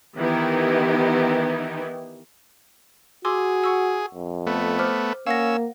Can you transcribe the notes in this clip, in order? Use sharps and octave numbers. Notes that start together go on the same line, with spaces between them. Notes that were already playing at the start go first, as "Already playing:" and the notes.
D#3 E3 B3 D#4 E4 G4
F#4 G#4 C6 D6 E6
F#5 C#6 E6
F2
A3 B3
C5 D6 F6
A#3 C#4 F5 F#5 E6 A#6